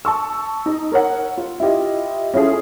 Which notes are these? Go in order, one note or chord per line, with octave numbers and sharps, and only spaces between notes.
A5 C#6 E6
D#4
A#4 C#5 F#5
F4
E4 F4 G4 D#5
C#4 E4 F4 G#4 A4